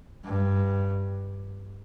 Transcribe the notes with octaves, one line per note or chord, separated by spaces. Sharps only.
G2